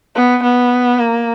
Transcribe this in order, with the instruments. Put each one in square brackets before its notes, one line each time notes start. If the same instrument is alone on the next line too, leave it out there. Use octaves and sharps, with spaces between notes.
[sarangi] B3
B3
A#3